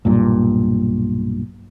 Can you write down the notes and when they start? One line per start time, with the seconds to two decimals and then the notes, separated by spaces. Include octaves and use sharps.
0.05 B1 G2 A#2